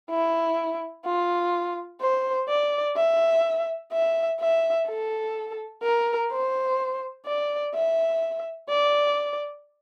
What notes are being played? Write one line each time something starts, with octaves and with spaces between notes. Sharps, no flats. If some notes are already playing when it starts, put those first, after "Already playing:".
E4
F4
C5
D5
E5
E5
E5
A4
A#4
C5
D5
E5
D5